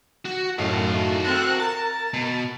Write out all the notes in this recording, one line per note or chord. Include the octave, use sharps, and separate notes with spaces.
F#4
F#2 A2 D#3 F#4 A4 F5
C4 A4 A#4 F#6
A#4 A5
B2